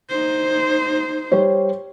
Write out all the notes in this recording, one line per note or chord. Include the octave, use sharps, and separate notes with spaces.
D#4 C5
G3 C5 C#5